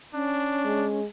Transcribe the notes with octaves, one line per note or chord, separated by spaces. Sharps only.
C#4 D4
G#3